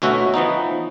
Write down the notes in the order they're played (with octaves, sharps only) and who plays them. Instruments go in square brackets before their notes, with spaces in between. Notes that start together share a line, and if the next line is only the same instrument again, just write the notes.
[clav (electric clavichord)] D2 B2 E3 C#4 F#4 E5
E3 F3 B3 D#4